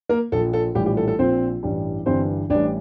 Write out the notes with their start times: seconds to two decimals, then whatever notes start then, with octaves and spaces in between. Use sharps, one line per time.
0.09 A#3 A#4
0.32 A#1 A#2 F3 A4
0.53 A4
0.75 A#1 A2 E3 G3 G4
0.86 G4
0.97 A4
1.08 A4
1.19 A#1 A#2 F3 C4 C5
1.63 A1 G2 E3 G3
2.06 G1 G2 E3 G3 C4 C5
2.50 A1 A2 E3 G3 D4 D5